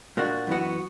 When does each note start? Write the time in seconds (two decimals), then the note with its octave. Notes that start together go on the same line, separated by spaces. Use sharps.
0.17 A#2 A#3 D4 F#4
0.47 F#2 E3 B3 F#4